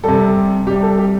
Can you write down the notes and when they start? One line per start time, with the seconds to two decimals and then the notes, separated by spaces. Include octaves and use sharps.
0.04 C3 G3 A4
0.66 C3 G4
0.71 G3
0.82 A4
0.98 G4